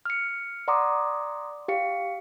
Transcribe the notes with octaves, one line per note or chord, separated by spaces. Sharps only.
F6 C#7
D5 F#5 A#5 C6 D6 D#6
G4 F5 C#7